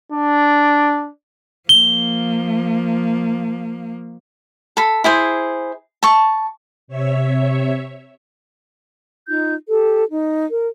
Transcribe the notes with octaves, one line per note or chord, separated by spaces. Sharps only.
D4
F3 A#3 G7
A4 B5
E4 G#4 C5
A5 C#6
C3 C#5 E5
D#4 F4 G6
G4 A4
D#4
A#4